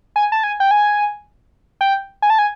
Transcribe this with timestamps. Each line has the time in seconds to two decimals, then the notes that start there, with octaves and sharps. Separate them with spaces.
0.16 G#5
0.32 A5
0.44 G#5
0.60 G5
0.71 G#5
1.81 G5
2.22 G#5
2.30 A5
2.39 G#5